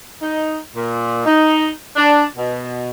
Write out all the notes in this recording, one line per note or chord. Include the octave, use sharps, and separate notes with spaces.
D#4
A#2
D#4
D4
B2